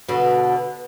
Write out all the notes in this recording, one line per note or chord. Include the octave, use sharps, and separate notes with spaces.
B2 D3